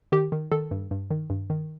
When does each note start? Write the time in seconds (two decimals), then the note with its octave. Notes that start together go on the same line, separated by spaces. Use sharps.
0.12 D#3 G4
0.32 D#3
0.52 D#3 A4
0.71 G2
0.91 G2
1.11 D#3
1.30 G2
1.50 D#3